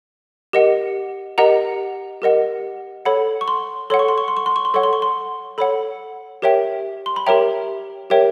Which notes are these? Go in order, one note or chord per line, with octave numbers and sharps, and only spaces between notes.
G4 A#4 D#5 F#5
G4 A#4 D#5 F#5 A#5
G4 A#4 D#5 F#5
A4 C#5 F#5 B5
C#6
C6
A4 C#5 F#5 C6
C#6
C6
C#6
C6
C#6
C6
C#6
C6
A4 C#5 F#5 C#6
C6
C#6
C6
A4 C#5 F#5 B5
G4 A#4 C#5 E5 G5
C6
B5
G4 A#4 C#5 E5 G5 A#5
G4 A#4 C#5 E5 G5